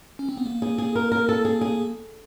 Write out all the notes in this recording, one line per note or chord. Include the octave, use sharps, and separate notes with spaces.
C#4
C4
B3
A#3
G#4
G#4
A#4
A#4
A4
G#4
G#4